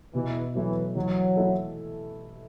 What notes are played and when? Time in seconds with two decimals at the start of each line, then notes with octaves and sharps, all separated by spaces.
0.14 B2 E3
0.55 E3 F#3 A3
0.95 E3 F#3
1.37 A3 E4 A4